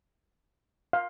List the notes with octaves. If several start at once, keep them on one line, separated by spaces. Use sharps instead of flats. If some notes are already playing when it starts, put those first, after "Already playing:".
F5